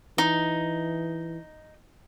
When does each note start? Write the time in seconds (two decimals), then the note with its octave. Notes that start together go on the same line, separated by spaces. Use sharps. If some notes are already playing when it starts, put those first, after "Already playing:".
0.18 E3 D#4